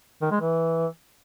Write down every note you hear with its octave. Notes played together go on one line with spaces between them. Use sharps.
D#3
G#3
E3